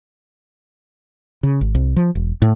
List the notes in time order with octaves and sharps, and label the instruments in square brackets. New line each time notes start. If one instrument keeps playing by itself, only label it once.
[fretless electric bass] C#3
G#1
C2
F3
E1
A2